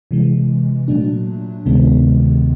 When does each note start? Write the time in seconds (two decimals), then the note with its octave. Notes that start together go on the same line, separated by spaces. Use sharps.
0.11 C3 E3 G#3
0.88 A#2 F#3 A3 D4
1.66 D2 C3 D#3 G#3 B3